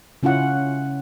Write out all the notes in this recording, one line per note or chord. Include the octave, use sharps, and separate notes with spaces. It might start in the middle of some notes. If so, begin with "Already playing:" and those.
C#3 C#4 E4 F4 F#5